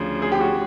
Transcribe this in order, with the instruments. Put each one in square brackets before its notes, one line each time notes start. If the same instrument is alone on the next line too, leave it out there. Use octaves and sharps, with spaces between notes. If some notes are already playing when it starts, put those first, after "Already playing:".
Already playing: [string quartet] D2 C#3 F3
[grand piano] G#4
G4
F#4